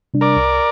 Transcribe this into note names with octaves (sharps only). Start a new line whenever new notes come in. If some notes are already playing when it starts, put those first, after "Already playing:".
C3 G3 D4
A#4 D5
C2